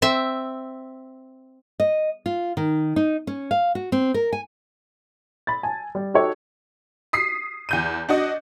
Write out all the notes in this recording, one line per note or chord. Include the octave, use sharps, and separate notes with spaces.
C4 E5
D#5
F4
D#3
D#4
C#4
F5
F#4
C4
A#4
G#5
B5 A6
G#5 A5
G3
D#4 F#4 G4 A4 C#5
D#6 B6 C7
E2 G6 D#7
D4 F#4 D#5